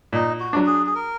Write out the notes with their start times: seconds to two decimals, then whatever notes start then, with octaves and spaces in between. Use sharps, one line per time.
0.13 A#2 D#4
0.40 F#4
0.53 F#3 D4
0.67 G#4
0.86 G#4
0.95 A#4